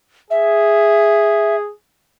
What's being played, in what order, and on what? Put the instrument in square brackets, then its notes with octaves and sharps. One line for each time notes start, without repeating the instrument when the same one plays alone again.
[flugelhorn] G#4 [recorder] E5